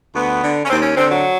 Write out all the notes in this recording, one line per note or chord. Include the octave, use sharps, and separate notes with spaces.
D2 B3
D3
C#4
D#2 C4
C#4
D3 C4
F#3